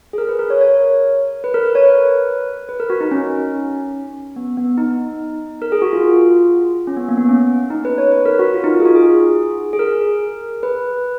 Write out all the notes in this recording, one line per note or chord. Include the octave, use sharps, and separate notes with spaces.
G#4
A#4
B4
A#4
C#5
C#5
B4
A#4
B4
C#5
B4
B4
A#4
F#4
D#4
C#4
B3
B3
D#4
A#4
G#4
F#4
F4
C#4
B3
A#3
B3
C#4
D#4
B4
C#5
B4
A#4
F#4
F4
D#4
F4
G#4
F#4
G#4
G#4
A#4
B4